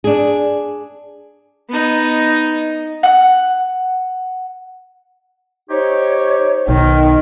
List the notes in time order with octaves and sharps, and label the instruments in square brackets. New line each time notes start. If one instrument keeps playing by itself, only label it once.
[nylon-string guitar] D4 G#4
[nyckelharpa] B3 D#4
[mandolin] F#5 F#6
[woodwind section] D#4 G4 C#5 [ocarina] C5
[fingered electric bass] B1 [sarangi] D#3 [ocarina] D#4